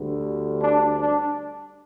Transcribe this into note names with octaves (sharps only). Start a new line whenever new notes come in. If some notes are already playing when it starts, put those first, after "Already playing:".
Already playing: D2 D3 G3
D4
D4